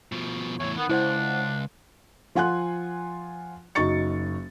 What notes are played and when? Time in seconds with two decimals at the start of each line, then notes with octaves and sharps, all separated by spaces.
0.12 B2 F3
0.60 E2 A2 C#5
0.77 D#3 B3
0.89 C#2 D4 E4 C5 F#5
2.35 F3 F4 F#5 G#5 C6 F#6
3.75 F#1 F#3 D#4 C#6 A6 C#7